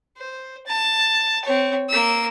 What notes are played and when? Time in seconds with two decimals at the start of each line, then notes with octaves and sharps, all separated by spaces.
0.17 C5
0.66 A5
1.45 C4 C#5
1.89 A#3 E6